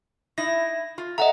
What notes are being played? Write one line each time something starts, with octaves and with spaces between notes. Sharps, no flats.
D#4 E4 A#6
F4
A4 D#5 E5 F#5 A#5